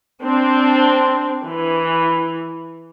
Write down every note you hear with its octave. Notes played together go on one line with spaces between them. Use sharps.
C4 D4
E3